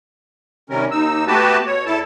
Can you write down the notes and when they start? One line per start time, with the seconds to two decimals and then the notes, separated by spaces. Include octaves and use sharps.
0.70 C3 D#3 G3 C#4 A#4
0.91 D#2 D#4 E6
1.27 A3 B3 F#4 G4 B4 A5
1.66 B2 C#5
1.86 E2 E4 A4 A5